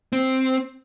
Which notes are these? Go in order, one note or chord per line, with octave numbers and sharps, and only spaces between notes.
C4